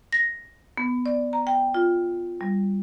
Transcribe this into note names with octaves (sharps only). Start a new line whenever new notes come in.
A#6
B3
D5
A#5
G5
F4
G3